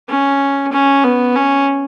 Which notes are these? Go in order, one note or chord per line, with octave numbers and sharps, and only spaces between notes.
C#4
C#4
B3
C#4